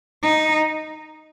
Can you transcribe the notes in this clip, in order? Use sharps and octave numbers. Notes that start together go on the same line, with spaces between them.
D#4